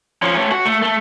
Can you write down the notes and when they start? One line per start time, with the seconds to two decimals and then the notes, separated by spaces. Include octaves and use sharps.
0.22 F3 C#4
0.35 A3 C#4
0.51 F#4
0.65 A3
0.82 A3